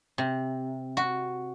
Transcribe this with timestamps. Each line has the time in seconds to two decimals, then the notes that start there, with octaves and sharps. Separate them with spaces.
0.18 C3
0.97 F#4